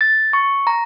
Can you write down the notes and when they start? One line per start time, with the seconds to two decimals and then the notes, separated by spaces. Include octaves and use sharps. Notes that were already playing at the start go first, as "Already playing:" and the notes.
0.01 A6
0.33 C#6
0.67 A#5